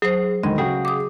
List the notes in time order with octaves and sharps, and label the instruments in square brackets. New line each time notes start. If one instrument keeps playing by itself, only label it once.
[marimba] F#3 C5 [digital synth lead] G#4
[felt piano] D2 D#3 [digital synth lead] G#3 [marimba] D#5
[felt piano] C#3 F#4 G5 [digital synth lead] G#4
[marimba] D6 D#6